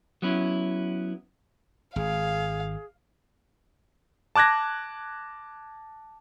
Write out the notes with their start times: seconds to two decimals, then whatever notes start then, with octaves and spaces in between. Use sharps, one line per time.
0.22 F#3 B3 C#4 E4
1.96 G#1 G#4 F5
4.35 A5 D6 F#6 G#6 A#6